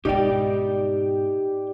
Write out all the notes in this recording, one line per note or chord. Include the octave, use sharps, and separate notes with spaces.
G#2 B2 D#4 G4 D5 G5